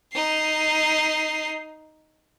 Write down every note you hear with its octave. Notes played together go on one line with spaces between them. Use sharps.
D#4 C7